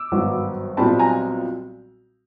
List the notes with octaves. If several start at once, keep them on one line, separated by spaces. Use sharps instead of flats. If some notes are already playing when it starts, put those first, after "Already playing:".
Already playing: D6 E6
G#1 G2 D#3 F#3 B3
B1 A#2 G3 C4 A5 B5
G#5 A#5